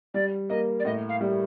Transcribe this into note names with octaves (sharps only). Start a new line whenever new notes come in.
G3 D5
A#3 D#5
D5
A2 D#5
F5
G3